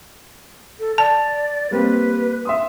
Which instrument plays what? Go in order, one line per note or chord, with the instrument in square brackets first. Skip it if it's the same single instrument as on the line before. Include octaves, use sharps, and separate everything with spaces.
[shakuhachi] A4
[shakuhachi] D5 [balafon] A5
[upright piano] G3 A#3 C4 [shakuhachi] B4
[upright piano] E5 C6 D#6